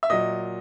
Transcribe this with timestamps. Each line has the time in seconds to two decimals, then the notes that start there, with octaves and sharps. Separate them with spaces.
0.03 E5
0.10 A#2 F#3 D#5